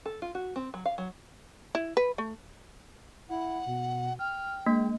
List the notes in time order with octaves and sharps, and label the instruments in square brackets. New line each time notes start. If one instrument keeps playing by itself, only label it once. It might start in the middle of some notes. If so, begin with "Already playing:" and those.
[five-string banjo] A4
F4
F#4
C4
F#3
F5
F#3
[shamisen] E4
B4
A3
[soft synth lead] E4 [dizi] F#5
[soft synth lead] B2
[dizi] G5 [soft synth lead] F6
[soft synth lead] G#3 [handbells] A#3 D4